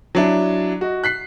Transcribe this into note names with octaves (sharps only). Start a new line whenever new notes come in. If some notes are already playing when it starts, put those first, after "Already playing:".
F#3 D4 E4
F#4 D#5
F#6 B6 C7